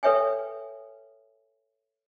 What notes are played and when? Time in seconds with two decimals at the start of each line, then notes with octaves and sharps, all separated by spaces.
0.03 A4 B4 C#5 E5 G5 G#5